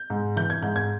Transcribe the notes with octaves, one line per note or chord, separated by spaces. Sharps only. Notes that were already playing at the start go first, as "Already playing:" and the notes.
Already playing: G6
G#2
E3 G6
G#6
G#2 G6
G#6